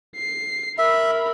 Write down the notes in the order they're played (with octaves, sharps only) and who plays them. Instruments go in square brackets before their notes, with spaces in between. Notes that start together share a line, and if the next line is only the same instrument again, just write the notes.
[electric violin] C7
[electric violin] A#4 B5 [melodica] E5